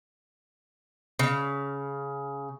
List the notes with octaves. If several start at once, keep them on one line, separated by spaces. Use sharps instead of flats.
C#3